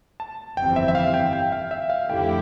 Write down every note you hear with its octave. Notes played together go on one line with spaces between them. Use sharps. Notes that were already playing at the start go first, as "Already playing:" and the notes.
A5
G1 F2 E3 G3 C4 G5
E5
E5
F5
G5
G5
F5
E5
F5
F2 D3 A3 E4 G4 G5